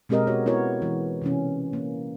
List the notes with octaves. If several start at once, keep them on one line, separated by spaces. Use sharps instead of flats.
B2 G#3 C4 G4 A#4 D#5
B3 F#4 C#5
B3 E4 F#4 A#4 C#5
E3 G#3
C3 E3 C#4
A#3